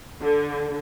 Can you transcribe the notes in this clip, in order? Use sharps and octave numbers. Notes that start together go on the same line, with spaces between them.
D3